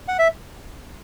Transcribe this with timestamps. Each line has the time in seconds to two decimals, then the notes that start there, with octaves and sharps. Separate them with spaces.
0.08 F#5
0.19 E5